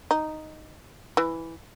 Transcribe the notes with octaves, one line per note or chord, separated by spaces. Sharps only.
D#4
E3